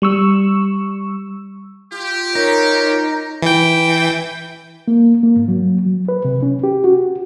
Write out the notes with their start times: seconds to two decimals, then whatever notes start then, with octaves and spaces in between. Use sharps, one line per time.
0.02 G3 C#6 E6
1.92 F4 G4
2.35 D#4 A#4 C#5
3.42 E3 G5
4.88 A#3
5.23 A#3
5.36 G#2
5.48 F#3
5.86 F#3
6.08 B4
6.25 C3
6.43 C#4
6.63 G4
6.84 F#4